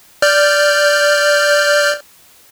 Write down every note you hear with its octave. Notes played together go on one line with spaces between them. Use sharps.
D5 F6 G6